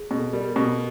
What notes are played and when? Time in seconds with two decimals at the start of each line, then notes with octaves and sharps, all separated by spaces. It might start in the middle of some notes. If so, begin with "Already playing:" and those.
Already playing: G#4
0.11 B2
0.18 A4
0.33 G3 A#4
0.44 A4
0.55 B2 G4
0.67 G4